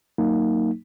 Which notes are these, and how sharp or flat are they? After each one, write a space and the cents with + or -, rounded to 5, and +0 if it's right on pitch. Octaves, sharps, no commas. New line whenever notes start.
F#3 +0 A#3 -15 D#4 +0